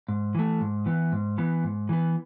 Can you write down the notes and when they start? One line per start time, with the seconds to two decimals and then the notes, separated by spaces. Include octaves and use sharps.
0.08 G#2
0.35 E3 A3
0.61 G#2
0.86 E3 B3
1.12 G#2
1.38 E3 B3
1.64 G#2
1.89 E3 B3